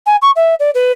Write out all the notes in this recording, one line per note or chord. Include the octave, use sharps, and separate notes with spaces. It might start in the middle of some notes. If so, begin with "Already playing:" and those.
G#5
C#6
E5
D5
B4